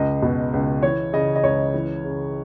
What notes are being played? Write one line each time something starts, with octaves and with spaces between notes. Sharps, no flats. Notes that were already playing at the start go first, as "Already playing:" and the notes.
Already playing: C#2 D#5
B2
C#2
E3 C#5
C#3 D#5
D#5
C#2 C#5
E3
C#3